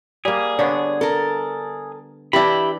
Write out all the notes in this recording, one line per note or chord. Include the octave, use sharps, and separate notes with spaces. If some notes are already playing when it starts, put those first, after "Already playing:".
G3 A#3 G#4
D3 B3 D4 C#5
A4 A#4
E3 D4 E4 G4 B5